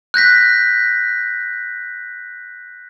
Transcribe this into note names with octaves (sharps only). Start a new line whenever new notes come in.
F#6 G6 A#6 B6